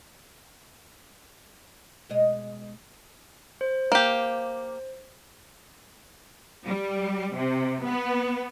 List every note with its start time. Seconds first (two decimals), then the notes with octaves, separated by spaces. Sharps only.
2.09 B2 G#3 D#5
3.61 C5
3.92 A#3 G4
6.67 G3
7.36 C3
7.87 B3